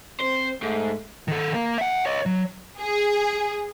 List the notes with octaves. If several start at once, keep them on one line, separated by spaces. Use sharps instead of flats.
C4 C5
G#2 A3
D#3 A4
A#3 A#4
E5 F#5
C#5 D#5
F#3
G#4